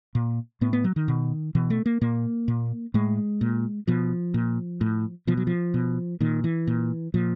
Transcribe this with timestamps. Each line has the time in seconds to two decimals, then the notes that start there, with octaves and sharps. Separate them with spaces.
0.15 A#2
0.61 A2 B3
0.73 B3
0.84 F#3
0.96 D#3
1.08 B2
1.55 B2 E3
1.70 A3
1.86 A#3
2.01 A#2 A#3
2.48 A#2
2.94 A2 G#3
3.41 A#2
3.87 B2 F3
4.34 A#2
4.81 A2
5.27 B2 F3
5.37 F#3
5.47 F3
5.74 B2
6.20 A#2 D#3
6.44 E3
6.67 A#2
7.14 A#2 F3